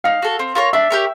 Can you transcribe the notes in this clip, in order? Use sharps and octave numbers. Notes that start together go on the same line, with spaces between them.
D#4 F5
F#4 A4
C4
F4 A#4 C#5
D4 E5
G4 A#4 C#5